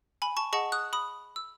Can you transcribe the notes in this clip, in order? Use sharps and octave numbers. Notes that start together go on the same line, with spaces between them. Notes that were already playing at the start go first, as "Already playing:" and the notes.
G#5 B5
A5 C#6
G#4 D#5 F#5 A5 C#6
D#6 F#6
B5 D#6
E6